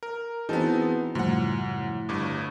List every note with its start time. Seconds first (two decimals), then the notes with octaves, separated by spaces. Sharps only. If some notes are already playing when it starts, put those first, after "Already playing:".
0.03 A#4
0.49 E3 B3 C4 D#4 F#4 G#4 A5
1.15 F#2 A2 C#3 F3 G3 F#5
2.09 G1 G2 D6